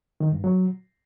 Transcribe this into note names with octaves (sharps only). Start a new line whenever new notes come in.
D#3
G2
F#3